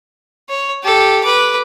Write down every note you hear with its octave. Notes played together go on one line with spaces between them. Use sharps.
C#5
G4 A4
B4 D6